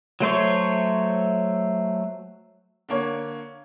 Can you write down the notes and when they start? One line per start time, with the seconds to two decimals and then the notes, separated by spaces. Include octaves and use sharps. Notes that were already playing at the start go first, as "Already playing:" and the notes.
0.20 F#3 A3 C5 C#5
2.89 D3 A#3 C#5